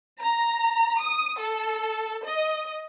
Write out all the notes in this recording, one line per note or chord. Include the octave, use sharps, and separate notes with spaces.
A#5
D#6
A4
D#5